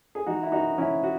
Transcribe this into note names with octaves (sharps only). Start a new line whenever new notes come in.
G#4
E3 D#4 F#4
E4
F#2 D#4 F#4
E3 C#4 E4
F#4